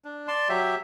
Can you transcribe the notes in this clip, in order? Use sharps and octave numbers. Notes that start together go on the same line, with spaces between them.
D4
D5 A5 C6
F#3 G4 E5